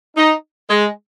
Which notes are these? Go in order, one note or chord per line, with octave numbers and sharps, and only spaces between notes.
D#4
G#3